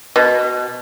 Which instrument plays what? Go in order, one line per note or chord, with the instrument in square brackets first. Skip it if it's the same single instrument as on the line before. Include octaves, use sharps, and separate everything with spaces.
[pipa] B2